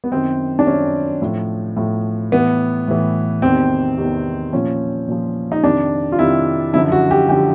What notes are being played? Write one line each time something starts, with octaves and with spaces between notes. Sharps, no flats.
B3
F#2 D#3 C4
D4
F#2 D#3 C#4
A2 F3
A2 F3
A2 E3 B3
A2 E3
E2 C3 D#3 C4
E2 C3 D#3
A#2 F3 C#4
A#2 F3
D#4
F2 C3 D#3 D4
F4
F2 C3 D#3 E4
F#2 D3 F3 E4
F#4
G4
D3 F3 G4